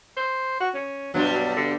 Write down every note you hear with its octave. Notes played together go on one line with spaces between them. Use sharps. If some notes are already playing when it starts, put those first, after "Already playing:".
C5
F#4
C#4
G2 B2 F#3 G3
F#3
D3